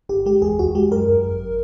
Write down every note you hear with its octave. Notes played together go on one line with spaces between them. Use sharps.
G1 G4
G#3 G4
E2 G#4
E2 F#4
G#3 G4
F#2 A#4
F#2
G#1